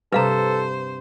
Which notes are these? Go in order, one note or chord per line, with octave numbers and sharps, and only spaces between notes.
G2 C3 A4 B4 C5 F5 A#5